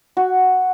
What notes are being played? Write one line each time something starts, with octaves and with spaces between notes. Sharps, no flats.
F#4